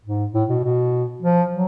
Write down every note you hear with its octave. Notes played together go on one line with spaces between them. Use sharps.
G#2
A2
B2
B2
F3
F#3